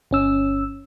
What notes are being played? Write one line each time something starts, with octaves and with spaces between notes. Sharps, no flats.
G1 C#4 E6